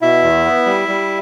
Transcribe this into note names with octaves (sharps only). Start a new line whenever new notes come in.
B2 E4 E5
E2
B3
G3
G3